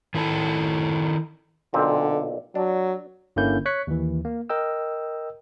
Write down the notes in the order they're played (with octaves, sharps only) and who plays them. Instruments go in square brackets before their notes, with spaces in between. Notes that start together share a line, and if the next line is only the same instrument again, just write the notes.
[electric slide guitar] D#3 E4 A4 A5
[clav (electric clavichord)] B1 A#2 C4 [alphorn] D3
[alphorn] F#3 [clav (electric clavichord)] D4
[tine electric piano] G1 D3 A#3 C#4 E4 G6
C#5 C#6 F#6 B6 C#7
D#2 E3
A#3
A#4 D#5 G5 E6